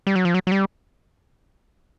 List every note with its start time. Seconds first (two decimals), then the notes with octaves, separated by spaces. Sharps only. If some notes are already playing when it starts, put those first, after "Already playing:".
0.07 G3
0.15 F#3
0.25 F3
0.34 F#3
0.47 F#3
0.52 G3